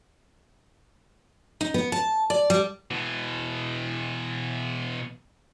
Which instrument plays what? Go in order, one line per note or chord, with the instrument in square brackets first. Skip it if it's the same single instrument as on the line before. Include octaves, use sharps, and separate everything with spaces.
[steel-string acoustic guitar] D#4
B3
A5
D5
G3
[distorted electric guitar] B2 E3